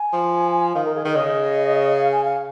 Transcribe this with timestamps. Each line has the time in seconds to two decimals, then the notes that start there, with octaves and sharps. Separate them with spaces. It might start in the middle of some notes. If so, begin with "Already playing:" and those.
Already playing: G#5
0.13 F3
0.74 D#3 F5
0.85 A#4
0.95 G#4
1.04 D#3 A#4
1.15 C#3 D#5
1.98 F5
2.12 G#5
2.25 F5